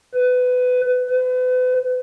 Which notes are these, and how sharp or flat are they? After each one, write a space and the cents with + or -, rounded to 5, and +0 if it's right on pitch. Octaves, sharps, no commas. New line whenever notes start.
B4 +20
B4 +40